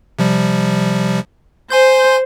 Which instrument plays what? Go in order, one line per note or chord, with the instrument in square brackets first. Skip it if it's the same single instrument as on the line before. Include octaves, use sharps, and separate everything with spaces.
[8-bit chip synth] C3 F3 G3
[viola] C5 [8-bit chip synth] G#5 C6 G6